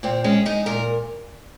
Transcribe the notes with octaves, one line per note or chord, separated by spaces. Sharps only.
A#2 C4
G#3 C#4
G#3 D#4
A#2 A#4